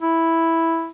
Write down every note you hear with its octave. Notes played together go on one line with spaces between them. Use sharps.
E4